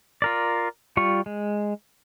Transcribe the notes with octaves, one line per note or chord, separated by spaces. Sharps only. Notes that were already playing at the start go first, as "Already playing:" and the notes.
F4 A#4 D5
G3 F4 C#6
G#3